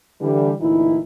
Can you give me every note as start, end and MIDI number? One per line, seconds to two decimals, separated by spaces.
0.22 0.53 50
0.22 0.53 52
0.22 0.53 55
0.60 1.01 38
0.60 1.01 46
0.60 1.01 52
0.60 1.01 63
0.60 1.01 64